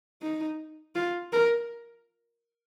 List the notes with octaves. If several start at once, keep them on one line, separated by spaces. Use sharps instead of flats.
D#4
F4
A#4